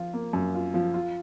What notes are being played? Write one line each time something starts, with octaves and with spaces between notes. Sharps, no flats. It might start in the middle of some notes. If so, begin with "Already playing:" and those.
Already playing: F3 F4
A#3
F#2
F4
F3
F4